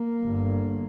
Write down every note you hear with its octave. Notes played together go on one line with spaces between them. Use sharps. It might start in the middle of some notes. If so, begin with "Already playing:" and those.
Already playing: A#3
G1 G2